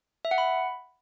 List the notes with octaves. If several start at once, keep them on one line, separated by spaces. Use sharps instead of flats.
E5
F#5
B5